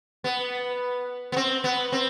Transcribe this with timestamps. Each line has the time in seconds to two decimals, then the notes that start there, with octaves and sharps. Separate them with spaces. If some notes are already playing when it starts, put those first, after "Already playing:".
0.24 B3
1.32 B3
1.37 C4
1.64 B3
1.92 C4